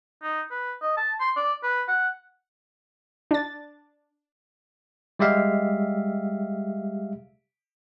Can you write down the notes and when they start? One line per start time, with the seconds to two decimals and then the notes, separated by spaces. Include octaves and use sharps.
0.23 D#4
0.51 B4
0.82 D#5
0.97 A5
1.20 C6
1.36 D5
1.63 B4
1.88 F#5
3.31 D4 A6
5.19 G3 G#3 G4 E5 F5